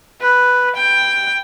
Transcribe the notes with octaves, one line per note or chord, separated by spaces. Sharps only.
B4
G5